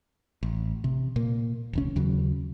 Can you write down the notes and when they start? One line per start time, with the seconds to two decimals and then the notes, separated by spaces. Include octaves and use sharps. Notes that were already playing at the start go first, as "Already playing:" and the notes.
0.43 A1
0.84 C3
1.16 A#2 A#3
1.73 E1 C#2 C#4
1.96 D#2 C#3 F#3